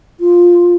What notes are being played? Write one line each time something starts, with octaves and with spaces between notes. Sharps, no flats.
F4